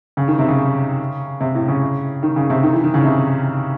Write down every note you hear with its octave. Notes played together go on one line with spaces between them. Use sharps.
C#3
D#3
C3
C#3
C3
A2
C#3
D#3
C#3
C3
D#3
E3
D#3
C#3
C3